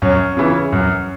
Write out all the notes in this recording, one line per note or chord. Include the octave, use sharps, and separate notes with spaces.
F#2 C#4
C#3 E3
F#2